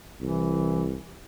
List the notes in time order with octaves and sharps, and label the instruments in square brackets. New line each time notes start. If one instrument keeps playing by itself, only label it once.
[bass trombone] C2 [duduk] E3